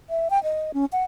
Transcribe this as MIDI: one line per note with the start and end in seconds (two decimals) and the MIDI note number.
0.10 0.28 76
0.30 0.42 79
0.43 0.72 75
0.74 0.85 61
0.93 1.04 78